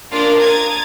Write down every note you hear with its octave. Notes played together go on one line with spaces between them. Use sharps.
A#3 D4 F4 A#4 D5 A6
A#5 D#6 G#6 A6